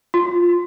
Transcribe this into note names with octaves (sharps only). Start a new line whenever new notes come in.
F4